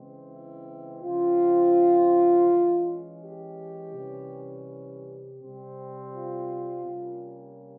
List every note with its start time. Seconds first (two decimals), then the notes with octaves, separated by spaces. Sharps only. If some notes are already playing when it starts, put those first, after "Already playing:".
Already playing: C#3 E3 G#3 C4
0.29 E4
1.02 C#3 F3 C4 F4
2.48 E3 G#3 C#4
3.21 G4
3.93 C3 E3 G3 C#4
4.67 G4
5.40 C3 G3 C4
6.13 F4
6.86 C3 G3 A#3 C#4